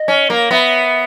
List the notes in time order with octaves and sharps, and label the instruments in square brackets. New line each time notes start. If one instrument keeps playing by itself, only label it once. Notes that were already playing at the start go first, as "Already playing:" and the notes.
Already playing: [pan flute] D#5
[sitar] C#4
A#3
[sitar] B3 [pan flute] E5